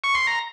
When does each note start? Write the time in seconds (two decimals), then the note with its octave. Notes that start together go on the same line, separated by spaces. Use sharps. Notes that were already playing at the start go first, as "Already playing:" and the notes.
0.04 C#6
0.15 C6
0.27 A#5